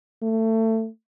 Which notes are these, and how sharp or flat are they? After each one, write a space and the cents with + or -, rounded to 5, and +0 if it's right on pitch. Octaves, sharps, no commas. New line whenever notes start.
A3 +20